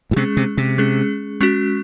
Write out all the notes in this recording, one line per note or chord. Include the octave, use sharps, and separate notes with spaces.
A2
C3 G#3 C#4 G#4
C3
C3
G#3 C#4 G#4
G#3 C#4 F#4